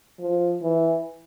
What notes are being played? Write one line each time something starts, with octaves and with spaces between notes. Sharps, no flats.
F3
E3